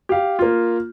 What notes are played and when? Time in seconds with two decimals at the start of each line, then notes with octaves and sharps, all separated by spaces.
0.09 G4 F5
0.39 A#3 F4